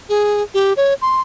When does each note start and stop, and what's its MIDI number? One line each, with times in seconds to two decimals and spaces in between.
0.09 0.42 68
0.54 0.73 67
0.77 0.94 73
1.02 1.21 84